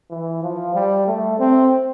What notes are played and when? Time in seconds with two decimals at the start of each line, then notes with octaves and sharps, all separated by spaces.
0.10 E3
0.42 F3
0.74 G3
1.07 A3
1.39 C4